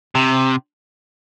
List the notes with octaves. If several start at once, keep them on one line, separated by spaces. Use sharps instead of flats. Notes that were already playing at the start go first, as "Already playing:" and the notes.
C3